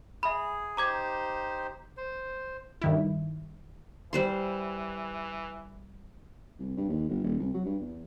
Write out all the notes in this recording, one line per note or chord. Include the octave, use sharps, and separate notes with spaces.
G#4 E5 B5
D#4 G4 C5 A#5 D6 G#6
C5
G2 D#3 E4
E3 G3 C5 C6
C2
G2
D#2
G1
D#1
C2
F#3
G2
E2